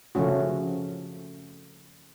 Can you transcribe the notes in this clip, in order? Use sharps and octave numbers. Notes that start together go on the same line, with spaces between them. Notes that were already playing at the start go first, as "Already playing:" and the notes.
C#3 F3 A3 C#4 F#4